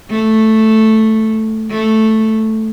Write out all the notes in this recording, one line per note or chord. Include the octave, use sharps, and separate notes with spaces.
A3
A3